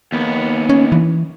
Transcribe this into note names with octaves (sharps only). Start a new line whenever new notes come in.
D#2 B3
C#4
E3